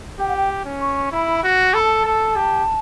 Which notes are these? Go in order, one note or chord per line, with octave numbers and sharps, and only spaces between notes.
G4 G5
F#5
G5
C#4
C#6
E4 B5
F#4
A4 B5
A5
A4
G4